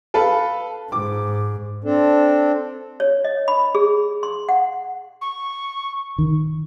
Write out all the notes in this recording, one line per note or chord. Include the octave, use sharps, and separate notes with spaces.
A4 B4 F5
G#2 D6
C4 D4 A4
C#5
D#5
B5
G#4
C6
F#5
C#6
D#3